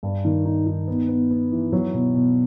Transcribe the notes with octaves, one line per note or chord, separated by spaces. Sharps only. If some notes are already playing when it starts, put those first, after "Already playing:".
G2
D#3
D#4
D#4
B3
B3
B3
E3
F#3
B2
B2